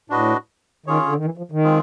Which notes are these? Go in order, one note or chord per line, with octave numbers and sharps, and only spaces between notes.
A2 D4 F#4 B4 D#5
D#3 C#4 F4 G#4 C#5
D3
D#3
E3
F3
D#3
G#3 C4 F4 G#4